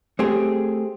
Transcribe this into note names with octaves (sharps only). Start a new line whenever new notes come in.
A3 C4 G4 G#4